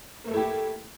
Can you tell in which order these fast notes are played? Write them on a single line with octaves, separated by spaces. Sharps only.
A#3 A3 A4 E4 G4